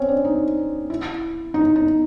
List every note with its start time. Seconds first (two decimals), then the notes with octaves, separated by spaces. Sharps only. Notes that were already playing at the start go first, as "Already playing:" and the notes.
Already playing: C4 C#4
0.08 D4
0.25 D#4
0.90 E4
1.54 D#4
1.76 D#4